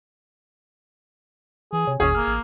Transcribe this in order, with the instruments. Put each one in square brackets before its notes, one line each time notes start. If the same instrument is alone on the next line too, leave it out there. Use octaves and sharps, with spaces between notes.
[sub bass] E3 [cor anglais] G#4
[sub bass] C3 [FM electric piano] C#5 G#5
[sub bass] G1 [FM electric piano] D#2 A#2 [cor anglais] C#4 [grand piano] G#4
[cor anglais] A#3 [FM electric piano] F6
[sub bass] A1